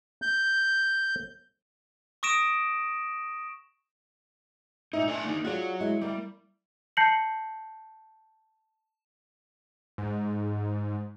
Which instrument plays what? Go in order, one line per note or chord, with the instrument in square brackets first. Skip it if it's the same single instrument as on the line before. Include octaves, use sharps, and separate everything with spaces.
[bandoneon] G6
[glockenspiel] C#6 D#6 A#6 D7 E7
[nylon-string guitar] A#2 D#5 E5 [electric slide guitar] D#4
[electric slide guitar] A3 D5 G#5 [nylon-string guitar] D4
[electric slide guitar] A#3 D#4
[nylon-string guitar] F4 G#4 D5 [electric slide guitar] F#4 C#5
[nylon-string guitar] G#3 E4
[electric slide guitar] G3 [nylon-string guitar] A#3
[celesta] A5 G6 A#6 C7 C#7 F#7
[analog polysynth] G#2